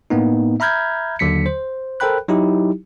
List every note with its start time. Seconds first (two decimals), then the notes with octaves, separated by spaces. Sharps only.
0.10 A2 A#3 B3 D#4
0.60 E5 A#5 B5 F6 G6 G#6
1.19 D#2 D3 F#3 B6 C#7
1.46 C5
2.00 A4 A#4 C5 G5 B5 F#6
2.28 F#3 D#4 E4 G4